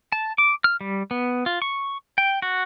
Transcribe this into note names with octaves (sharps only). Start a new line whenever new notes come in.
A5
D6
F6
G3
B3
F4
C#6
G5
F#4